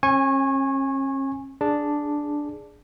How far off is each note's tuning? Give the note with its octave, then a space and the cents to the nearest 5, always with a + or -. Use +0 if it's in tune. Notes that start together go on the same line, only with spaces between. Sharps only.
C#4 -45 G#5 -10 C#6 -25
D4 +0 G#4 +0